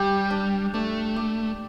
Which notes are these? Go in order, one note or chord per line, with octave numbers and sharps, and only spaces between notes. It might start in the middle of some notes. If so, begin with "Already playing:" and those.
Already playing: G3 G4
D4
A3 D4
D5